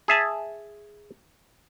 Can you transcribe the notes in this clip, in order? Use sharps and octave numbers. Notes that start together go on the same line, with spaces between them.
G#4 E5 A5